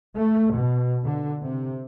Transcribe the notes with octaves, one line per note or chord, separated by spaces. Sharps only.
A3
B2
D3
C3